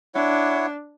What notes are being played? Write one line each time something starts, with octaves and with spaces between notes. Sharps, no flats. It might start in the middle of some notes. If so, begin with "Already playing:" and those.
D4 E4 C#5 F#5